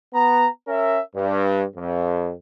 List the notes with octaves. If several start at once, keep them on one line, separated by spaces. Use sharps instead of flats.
B3 A#5
C#4 A#4 E5
G2
F2